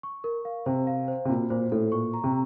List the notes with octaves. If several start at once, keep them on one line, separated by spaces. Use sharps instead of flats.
C#6
A#4
F5
C3 C5
F5
C5
C3
A#2 F#4
A#2 C5
A2 A4
A#2 C#6
A#5
C3